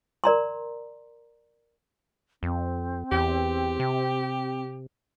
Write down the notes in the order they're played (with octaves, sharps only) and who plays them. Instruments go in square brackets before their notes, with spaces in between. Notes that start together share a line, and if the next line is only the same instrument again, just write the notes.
[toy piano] A#4 D5 A#5 C6
[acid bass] F2 [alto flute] C4
[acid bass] E2 [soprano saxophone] G4
[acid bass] C3